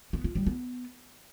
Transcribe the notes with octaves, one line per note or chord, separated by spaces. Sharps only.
B3
F4
G3
B3